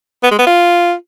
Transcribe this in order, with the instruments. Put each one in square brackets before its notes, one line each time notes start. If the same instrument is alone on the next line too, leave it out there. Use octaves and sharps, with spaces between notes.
[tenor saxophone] B3
G#3
B3
F4